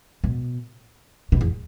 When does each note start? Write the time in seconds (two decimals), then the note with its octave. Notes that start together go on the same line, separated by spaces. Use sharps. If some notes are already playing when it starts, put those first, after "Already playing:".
0.24 B2
1.32 B2
1.41 E2